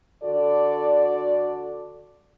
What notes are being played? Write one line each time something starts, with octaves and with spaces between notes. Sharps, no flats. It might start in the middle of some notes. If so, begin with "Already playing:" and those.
D3 F#4 A4 D5